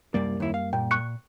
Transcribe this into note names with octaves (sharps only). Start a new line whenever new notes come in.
C2 F#2 G3 A#3 D5
D#2 E4
F5
A#2 G5
C#6 F#6 C#7